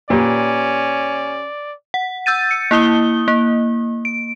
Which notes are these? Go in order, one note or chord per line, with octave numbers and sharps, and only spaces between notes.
A#2 C#4 G4 B4 D5
F#5
E6 G6 A6 D#7
C#7
A#3 E4 D#6 G7
A#3
D7